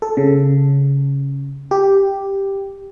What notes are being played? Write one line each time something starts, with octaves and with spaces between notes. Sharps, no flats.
A4
C#3
G4